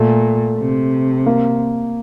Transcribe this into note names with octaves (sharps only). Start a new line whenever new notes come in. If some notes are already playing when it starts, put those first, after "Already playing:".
Already playing: A#2 A3
C3
A#3